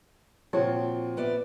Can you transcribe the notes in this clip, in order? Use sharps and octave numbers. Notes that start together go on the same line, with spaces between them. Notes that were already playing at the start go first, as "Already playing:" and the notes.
A#2 F3 C4 F#4 C#5
B3 D5 E5